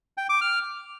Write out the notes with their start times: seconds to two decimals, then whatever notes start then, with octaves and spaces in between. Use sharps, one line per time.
0.18 G5
0.29 D6
0.41 F6